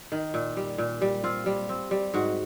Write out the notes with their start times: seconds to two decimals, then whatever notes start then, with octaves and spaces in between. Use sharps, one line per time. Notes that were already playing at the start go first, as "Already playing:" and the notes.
0.12 D#3
0.34 A#2
0.57 G3
0.78 A#2
1.02 G3
1.24 C4 F4
1.46 G3
1.69 C4
1.91 G3
2.14 G#2 F#4